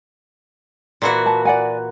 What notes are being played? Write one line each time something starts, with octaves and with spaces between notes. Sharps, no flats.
A#2 E3 F#4
A5
D5 F#5 G#5